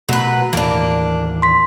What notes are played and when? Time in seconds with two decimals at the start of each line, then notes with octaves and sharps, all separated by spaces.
0.09 B2 F#3 A3 B4
0.53 D#2 A2 E3 A#3 D4
1.42 C6 B6